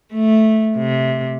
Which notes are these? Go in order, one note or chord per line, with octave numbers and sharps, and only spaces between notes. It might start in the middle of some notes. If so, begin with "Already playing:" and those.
A3
C3